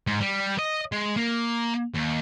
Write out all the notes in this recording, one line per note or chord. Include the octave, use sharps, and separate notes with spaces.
G#2
G3
D#5
G#3
A#3
D#2